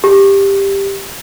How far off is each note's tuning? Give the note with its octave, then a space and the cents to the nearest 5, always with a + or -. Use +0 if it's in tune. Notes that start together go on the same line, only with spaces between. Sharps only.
G4 +10